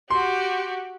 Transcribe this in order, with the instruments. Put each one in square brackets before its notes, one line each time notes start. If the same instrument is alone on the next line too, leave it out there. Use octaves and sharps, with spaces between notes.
[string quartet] F#4 G4 [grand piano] C6